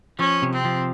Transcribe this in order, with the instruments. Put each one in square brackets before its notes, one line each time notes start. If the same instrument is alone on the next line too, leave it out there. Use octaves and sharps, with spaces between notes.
[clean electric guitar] F3 [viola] C#4
[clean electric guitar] C3
[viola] C4
[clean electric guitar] F3